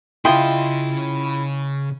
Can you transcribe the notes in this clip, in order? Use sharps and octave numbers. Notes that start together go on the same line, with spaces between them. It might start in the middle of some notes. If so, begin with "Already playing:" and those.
C#3 E4 F4 G#4 D#5 G5 C6